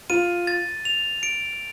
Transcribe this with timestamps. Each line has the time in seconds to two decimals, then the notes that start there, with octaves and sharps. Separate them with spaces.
0.10 F4 D#7
0.47 A6
0.85 F7
1.23 D7